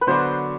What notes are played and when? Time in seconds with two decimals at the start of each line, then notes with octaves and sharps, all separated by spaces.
0.01 B4
0.07 D3 F#3 B3 D4 F#4 C5